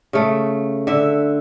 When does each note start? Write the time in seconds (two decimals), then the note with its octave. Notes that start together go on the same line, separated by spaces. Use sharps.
0.13 C#3 A3
0.87 D3 E5